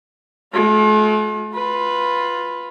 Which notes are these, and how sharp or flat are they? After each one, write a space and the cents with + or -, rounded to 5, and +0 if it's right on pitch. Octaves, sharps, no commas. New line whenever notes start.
A3 -45 F4 +35
F4 +10 B4 +0